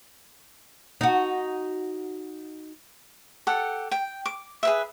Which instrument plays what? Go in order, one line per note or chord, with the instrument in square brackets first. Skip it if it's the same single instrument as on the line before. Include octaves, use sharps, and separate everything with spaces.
[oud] D#4 F#4
[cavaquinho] G4 A4 F#5
G5
D6
G#4 B4 E5